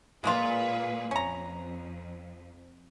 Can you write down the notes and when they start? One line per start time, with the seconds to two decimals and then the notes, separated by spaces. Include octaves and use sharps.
0.24 A#2 G#3 A#3 F4 G#4 B4
1.11 F2 C#4 A#5